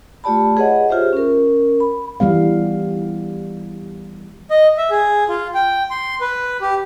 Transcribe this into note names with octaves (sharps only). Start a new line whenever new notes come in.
A3 F4 G4 D5 A5 B5
G#4 B4 C#5 D#5 F#5
F4 G4 G#4 C5 E5
C#4 A#4
B5
E3 G3 B3 F5
D#5
E5
G#4
F4
G5
C6
B4
G4